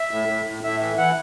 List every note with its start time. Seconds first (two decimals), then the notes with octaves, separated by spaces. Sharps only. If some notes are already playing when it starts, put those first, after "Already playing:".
Already playing: E5
0.11 A2
0.28 A2
0.45 A2
0.64 A2 E5
0.81 E3 E5
0.97 E3 F#5